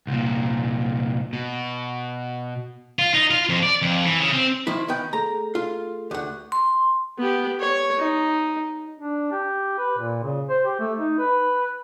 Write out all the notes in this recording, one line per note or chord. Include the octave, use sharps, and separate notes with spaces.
C2 A#2
B2
F4
D#4
F4
F2
D5
F2
E3
C#3
C4
D#3 F3 E4
D#3 B3 G5
A3 G#4 A4 A#5
F4
D2 F#5
C6
B3 G4
C#5
D#4
D4
G4
B4
A#2
C#3
C5
G4
A3
D#4
B4